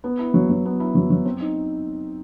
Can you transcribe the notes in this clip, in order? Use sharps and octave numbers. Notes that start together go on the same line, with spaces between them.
B3
E4
F#3
F#3
B3
E4
F#3
F#3
C4
D#4